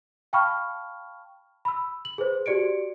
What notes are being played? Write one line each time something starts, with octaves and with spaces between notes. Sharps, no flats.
F5 G5 A5 B5 C#6 F6
B5 E6
F#7
G#4 B4 C5
F#4 G4 D5 C#7 D7